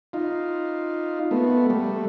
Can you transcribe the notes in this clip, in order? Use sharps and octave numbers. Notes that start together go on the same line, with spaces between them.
D#4 F4
A3 B3
G3 A3